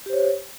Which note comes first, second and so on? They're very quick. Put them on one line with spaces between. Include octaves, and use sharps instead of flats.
G4 C5 C#5